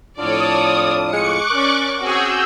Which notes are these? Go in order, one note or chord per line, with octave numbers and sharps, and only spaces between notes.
F2 A2 D4 F4 A4 C#5 D5 D#6
G#3 C#6 D6 F#6 C#7
C#4 A#4 D5
C4 C#4 F#4 G#4 E6 G6